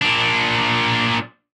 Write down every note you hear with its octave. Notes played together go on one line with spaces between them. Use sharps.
A#2 D4